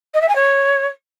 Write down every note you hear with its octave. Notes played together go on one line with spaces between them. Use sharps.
D#5
E5
G#5
C#5